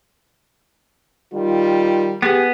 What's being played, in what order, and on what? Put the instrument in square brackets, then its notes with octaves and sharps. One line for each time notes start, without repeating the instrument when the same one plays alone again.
[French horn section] D#3 G3 F4
[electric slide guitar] B3 [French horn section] G4 G#4